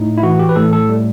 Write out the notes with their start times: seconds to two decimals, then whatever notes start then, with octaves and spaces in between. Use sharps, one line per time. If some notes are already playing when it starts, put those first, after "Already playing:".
Already playing: A2 D#4
0.18 E4
0.23 E3 F#4
0.39 G4
0.49 B4
0.56 A2 A4
0.73 A4
0.89 G3